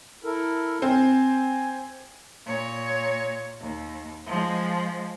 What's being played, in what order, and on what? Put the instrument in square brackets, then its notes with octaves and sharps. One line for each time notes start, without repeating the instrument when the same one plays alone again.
[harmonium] E4 A4 A#4
[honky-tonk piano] C4 [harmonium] G#5
[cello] A#2 C#5
D#2
F3 G#3